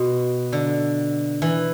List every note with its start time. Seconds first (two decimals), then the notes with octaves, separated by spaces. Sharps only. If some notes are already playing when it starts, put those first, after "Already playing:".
Already playing: B2 F#4
0.52 D3
1.42 E3